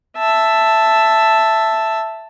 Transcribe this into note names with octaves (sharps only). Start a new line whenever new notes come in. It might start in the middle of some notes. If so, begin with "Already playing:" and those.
E5 A5